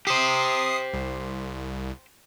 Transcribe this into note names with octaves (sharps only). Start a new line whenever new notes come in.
G4 C5 D#6 C7
C2